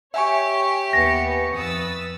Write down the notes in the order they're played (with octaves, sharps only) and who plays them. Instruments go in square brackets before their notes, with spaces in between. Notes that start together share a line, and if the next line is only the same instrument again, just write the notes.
[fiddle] G4 [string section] C#5 [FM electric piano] E5 G#5 C#6
[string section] D#2 B3 C#7 [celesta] A#6
[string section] F2 D#6 A6 [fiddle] B4 E6